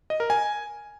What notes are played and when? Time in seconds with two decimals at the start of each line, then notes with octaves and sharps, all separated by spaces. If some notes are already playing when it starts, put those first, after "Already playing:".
0.10 D#5
0.20 A#4
0.30 G#5